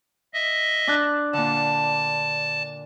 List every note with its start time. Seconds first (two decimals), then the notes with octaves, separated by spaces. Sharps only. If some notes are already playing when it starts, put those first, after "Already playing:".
0.34 D#5 E5
0.87 D4 A5 F#6
1.33 A#2 D3 A5